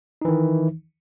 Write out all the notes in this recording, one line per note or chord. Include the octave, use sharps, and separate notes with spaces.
D#3 E3 D#4